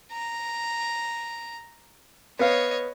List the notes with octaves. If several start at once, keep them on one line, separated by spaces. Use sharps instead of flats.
A#5
B3 C#5 D#5 F5